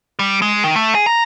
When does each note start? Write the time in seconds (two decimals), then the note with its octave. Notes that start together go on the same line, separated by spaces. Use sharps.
0.19 G3
0.42 G#3
0.64 D#3
0.76 A3
0.95 G#4
1.06 A#5